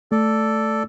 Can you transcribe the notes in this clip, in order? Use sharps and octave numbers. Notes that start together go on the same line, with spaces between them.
A3 A4 D5